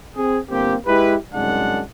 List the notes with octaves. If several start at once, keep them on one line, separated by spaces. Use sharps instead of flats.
C4 G#4
G1 A#3 C4 G4
G#3 E4 G4 B4
C2 F#2 G#3 D4 F#5